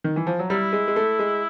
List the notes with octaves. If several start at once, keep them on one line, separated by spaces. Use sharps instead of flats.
D#3
E3
F3
F#3
G3 E4
G#3
G#3
A3
G#3